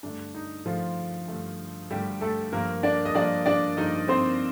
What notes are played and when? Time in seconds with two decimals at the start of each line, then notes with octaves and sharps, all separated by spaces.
0.03 G2 D3 A3 D4
0.34 D#4
0.65 G2 D3 F3 A3 F4
1.28 G2 D3 A3
1.91 G2 D3 G3 A3 G4
2.21 A3 A4
2.52 G2 F3 A#3 A#4
2.83 D4 D5
3.05 D#5
3.14 G2 F3 A#3 D4 D5
3.46 D4 D5
3.77 G2 F3 A#3 D#4 D#5
4.08 C4 C5